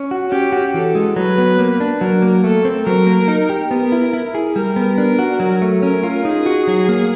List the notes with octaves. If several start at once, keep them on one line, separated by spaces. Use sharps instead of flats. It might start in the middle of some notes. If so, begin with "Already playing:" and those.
Already playing: C#4
F#4
C#4 G4
F#4
E3 A4
G#3
F#3 B4
B3
A#3
D4
F#3 A#4
A#3
A3 A4
C4
F#3 A#4
A#3
D#4
G4
B3 A#4
E4
E4
G#4
G3 A#4
B3
D4 A#4
F#4
F#3
A3
C#4 A#4
F4
D#4 G#4
F#4
F#3
A#3